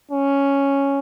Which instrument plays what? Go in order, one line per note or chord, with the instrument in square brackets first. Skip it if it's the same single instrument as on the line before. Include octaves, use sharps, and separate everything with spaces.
[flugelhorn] C#4